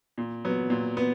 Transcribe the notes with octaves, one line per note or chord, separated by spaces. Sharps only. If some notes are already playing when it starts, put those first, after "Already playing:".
A#2
F#3 B3
A#2
B3